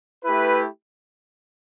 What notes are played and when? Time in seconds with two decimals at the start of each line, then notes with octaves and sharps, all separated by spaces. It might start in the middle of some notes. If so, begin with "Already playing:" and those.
0.24 A3 E4 G4 B4